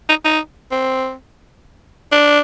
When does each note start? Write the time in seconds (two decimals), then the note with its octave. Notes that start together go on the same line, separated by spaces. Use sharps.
0.09 D#4
0.25 D#4
0.71 C4
2.12 D4